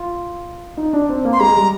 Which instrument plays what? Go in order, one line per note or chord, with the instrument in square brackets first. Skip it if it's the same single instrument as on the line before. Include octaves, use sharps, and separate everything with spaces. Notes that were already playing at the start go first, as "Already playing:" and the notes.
Already playing: [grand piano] F4
D#4
D4
C4
A#3
[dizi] C6
[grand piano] G#3 [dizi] A#5
[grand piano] G3